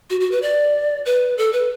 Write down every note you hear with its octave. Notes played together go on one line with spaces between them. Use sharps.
F#4
F#4
B4
D5
B4
A4
B4